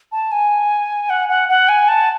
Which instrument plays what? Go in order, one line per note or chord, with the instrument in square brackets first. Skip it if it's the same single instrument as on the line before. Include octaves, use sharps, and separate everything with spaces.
[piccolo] A5
G#5
F#5
F#5
F#5
G#5
A5